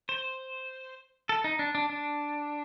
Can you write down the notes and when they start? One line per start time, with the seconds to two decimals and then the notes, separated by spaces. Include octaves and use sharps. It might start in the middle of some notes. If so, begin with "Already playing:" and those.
0.09 C5
1.29 A4
1.44 D#4
1.59 D4
1.75 D4
1.90 D4